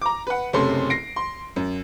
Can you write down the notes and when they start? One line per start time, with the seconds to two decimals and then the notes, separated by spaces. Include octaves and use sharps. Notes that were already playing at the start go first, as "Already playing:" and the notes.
0.02 A#5 D6
0.27 B4 F#5
0.53 F#1 C3 A3 C#4 A4 C6
0.90 A#6 C7 D7
1.16 C6
1.56 F#2